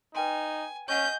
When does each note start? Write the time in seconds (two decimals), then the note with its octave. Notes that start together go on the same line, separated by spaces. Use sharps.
0.15 D#4 B4 G5 G#5 C6
0.89 C#4 D#5 F#5 G#5 C#6 G6